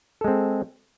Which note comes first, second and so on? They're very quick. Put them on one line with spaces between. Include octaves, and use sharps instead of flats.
A4 G#3 C4